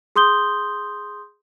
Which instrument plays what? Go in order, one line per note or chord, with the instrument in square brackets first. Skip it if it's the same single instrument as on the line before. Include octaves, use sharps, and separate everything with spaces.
[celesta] G#4 C6 D#6 G6 G7